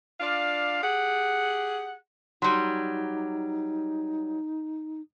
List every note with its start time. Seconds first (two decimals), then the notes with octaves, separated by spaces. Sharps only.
0.20 D4 F4 D5 F5
0.83 G4 G#4 F#5
2.42 F#3 G3 D#4 C6